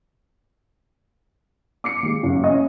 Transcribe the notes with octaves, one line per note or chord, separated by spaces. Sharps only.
D6 C7 C#7
D#2 G#3
F#1
C#4 D#5